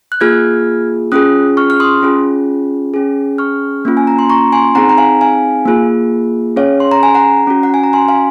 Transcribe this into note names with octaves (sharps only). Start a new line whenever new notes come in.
F#6
A#3 F4 G#4 F6 G#6
C#4 F4 G#4 D#6 F#6
C#6 F6
F6
C6 D#6
C#4 F4 G#4
C#4 G#4
C#6 F6
A#3 C#4 F4
G#5
A#5
C6
A#5 C#6
G#5 C6
C4 D#4 G#4 F#5 A#5
A#5
F5 G#5
F5 G#5
A#3 F4 G#4
C#4 G#4 C#5 F5
C6
A#5
G#5
F#5 A#5
C#4 F#4
F#5
G#5
A#5
G#5 C6
F5 G#5